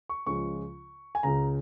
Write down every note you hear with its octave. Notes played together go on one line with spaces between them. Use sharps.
C#6
C#2 C#3 F3 G#3 C#6
G#5
C#2 C#3 G#3 A#5